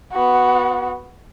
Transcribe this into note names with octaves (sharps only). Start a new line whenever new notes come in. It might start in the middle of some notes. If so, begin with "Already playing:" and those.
B3 F#4